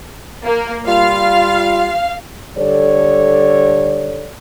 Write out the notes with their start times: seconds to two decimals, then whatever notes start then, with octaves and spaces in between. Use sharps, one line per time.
0.45 A#3
0.87 G3 F4 F5
2.58 D3 G3 A4 C#5 D5